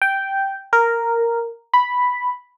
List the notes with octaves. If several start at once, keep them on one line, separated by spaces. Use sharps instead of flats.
G5
A#4
B5